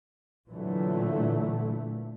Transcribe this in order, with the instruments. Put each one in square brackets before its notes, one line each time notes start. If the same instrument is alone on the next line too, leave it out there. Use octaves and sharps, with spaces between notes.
[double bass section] A#2 D3 E3 F#3 A3